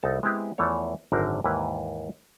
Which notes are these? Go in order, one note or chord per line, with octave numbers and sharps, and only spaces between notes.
C2 D#4 A4 A5
G#3 B3 C4 E4 G4 G#4
E2 E3 F3 A3 C#5
G#1 F#2 D3 A#4 C5
D#2 G#2 E3 A#3 E4 B4